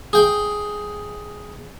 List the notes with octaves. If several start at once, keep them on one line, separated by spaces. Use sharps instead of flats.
G#4 G5